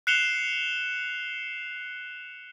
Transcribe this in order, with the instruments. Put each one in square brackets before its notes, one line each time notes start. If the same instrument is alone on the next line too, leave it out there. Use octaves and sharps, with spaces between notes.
[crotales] F#6 C7 C#7 E7 F7 G7